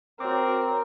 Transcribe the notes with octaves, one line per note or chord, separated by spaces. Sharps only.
C4 F#4 A#4 C#5 D6